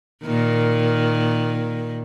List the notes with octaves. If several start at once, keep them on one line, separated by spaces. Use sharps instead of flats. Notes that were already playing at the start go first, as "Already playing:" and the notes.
A#2 D#3